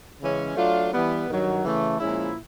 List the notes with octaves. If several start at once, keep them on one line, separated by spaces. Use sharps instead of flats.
C#3 E3 G#3 C#4
F#3 A3 D4 F4
E3 G3 B3
G2 D#3 F#3
C#3 E3 A3
A#2 F3 G#3 C#4 E4